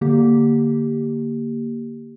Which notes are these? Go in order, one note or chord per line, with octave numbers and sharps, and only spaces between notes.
D3 A#3 G4